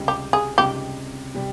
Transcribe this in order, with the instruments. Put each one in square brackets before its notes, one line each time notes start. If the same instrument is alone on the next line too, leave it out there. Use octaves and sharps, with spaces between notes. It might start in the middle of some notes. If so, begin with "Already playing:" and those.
Already playing: [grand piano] C#2 C3 G3
[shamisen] G4
G#4
[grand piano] C#2 C3 G3 [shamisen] G4
[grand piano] C3 G3